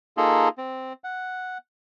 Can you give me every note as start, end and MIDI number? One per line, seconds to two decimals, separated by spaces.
0.17 0.49 58
0.17 0.49 63
0.17 0.49 65
0.17 0.49 68
0.17 0.49 69
0.58 0.93 60
1.04 1.58 78